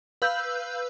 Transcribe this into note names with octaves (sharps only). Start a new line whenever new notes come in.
B4 F5 E6 G6